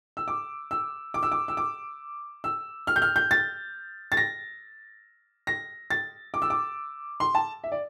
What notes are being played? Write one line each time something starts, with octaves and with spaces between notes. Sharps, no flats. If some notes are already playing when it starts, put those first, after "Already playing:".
E6
D6
E6
D6
E6
D6
E6
D6
E6
F6
G6
F6
G6
A6
A6
A#6
A#6
A6
D6
E6
D6
C6
A5
E5
D5